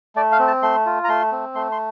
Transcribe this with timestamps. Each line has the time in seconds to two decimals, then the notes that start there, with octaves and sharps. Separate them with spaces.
0.16 A3 D5
0.32 F5
0.39 C4
0.47 A5
0.62 A3 C6
0.86 F4
1.04 A#5
1.09 A3 C6
1.32 C4
1.55 A3 C6
1.72 C6